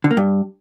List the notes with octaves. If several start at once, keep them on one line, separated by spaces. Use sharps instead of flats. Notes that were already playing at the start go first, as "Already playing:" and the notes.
D3
A#3
G2